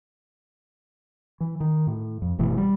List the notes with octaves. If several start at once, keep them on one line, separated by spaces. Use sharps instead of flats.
E3
D#3
A2
F2
G1 B2 E3 A3
G3